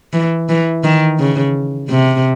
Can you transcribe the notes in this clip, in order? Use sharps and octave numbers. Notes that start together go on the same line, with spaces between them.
E3
E3
D#3
C#3
C3